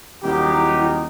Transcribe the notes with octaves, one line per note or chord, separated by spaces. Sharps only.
D#1 F#3 D#4 E4 G4 A#4